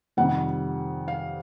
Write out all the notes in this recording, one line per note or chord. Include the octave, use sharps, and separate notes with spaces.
F2 C3 D#3 G3 F#5
F5